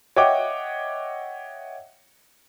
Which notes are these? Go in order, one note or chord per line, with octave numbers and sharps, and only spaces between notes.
C#5 D#5 E5 F#5 G5 D6